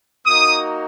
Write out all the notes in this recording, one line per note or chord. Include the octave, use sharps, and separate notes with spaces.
A#3 D#4 F#4 D#6